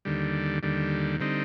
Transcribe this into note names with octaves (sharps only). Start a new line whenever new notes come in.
D#2 D3 G3
D#2 D3 G3
D3 G3 C4 D#4